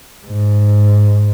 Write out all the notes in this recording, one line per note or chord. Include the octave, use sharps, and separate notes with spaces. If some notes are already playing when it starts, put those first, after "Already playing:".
G#2